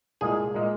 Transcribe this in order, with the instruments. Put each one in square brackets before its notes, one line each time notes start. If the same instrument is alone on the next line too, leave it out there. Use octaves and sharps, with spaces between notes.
[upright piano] C2 A#2 G#3 [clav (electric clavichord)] G#4
[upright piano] A#2 G#3